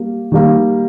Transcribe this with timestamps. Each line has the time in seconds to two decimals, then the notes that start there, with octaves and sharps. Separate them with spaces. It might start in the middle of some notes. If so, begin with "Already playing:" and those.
Already playing: G3 A#3
0.32 D#3 G3 A#3